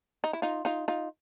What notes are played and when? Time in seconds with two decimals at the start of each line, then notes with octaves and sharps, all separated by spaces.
0.24 D#4
0.33 E4
0.42 D#4 F4
0.65 D#4 F4
0.88 D#4 F4